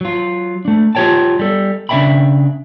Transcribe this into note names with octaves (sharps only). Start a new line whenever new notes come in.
F#3 F4
A3 D4
F4 G4 G#4 C#5 G5 A5
G3 A4
C#3 D4 C5 E5 G5 B5